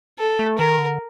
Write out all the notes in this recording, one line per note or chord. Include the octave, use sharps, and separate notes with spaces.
A4
A3
D#3 A#4
D3